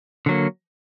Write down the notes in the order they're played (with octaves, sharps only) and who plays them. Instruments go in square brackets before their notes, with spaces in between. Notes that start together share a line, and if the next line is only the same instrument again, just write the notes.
[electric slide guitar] D3 F#3 A#3